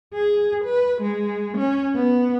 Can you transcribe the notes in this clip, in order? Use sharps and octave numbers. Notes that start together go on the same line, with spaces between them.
G#4
B4
G#3
C#4
B3